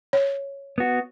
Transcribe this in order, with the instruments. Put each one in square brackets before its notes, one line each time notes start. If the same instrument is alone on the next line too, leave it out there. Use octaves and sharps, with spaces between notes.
[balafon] C#5
[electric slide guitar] B3 F#4